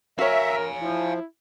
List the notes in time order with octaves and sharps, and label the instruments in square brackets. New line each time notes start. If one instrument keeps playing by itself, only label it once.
[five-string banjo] F#4 C#5 [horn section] A#4 [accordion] E5 [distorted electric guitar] F5 G#5
[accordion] F3 [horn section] E4